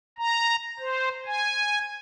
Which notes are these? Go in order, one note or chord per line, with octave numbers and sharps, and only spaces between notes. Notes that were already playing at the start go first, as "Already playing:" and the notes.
A#5
C5
G#5